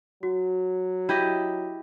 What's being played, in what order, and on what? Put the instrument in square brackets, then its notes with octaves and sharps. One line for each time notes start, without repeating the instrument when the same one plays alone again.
[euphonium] F#3 [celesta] F#4
[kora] E4 G4 D#5